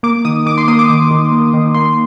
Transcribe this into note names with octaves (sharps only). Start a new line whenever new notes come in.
A#3 D6
D#3 D#6
D#3 D6
C6
A#3 D#6
D6
D#3 D6
D#3
A#3
D#3
A#3 C6